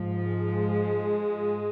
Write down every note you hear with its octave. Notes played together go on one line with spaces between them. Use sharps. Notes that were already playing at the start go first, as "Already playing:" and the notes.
Already playing: G#2 F3
G#3